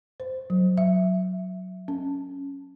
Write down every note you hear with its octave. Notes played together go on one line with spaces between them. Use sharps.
C5
F#3
E5
C#4